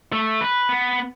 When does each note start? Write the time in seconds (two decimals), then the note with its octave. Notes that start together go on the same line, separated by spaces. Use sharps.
0.13 A3
0.41 B4
0.69 B3